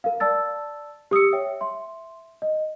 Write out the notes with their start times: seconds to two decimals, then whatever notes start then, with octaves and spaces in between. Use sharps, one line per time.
0.04 A#4 F5
0.20 D5 A5 E6 A6
1.11 G4 D#6 E6 C#7
1.33 C#5 E5 G5
1.61 E5 C6
2.42 D#5